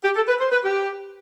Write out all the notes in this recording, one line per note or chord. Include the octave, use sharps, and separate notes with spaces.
G4
A4
B4
C5
B4
G4